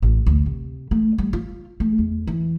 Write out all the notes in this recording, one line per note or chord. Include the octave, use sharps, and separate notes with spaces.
A1
D2
C3
A3
G3
F4
A3
E2
E3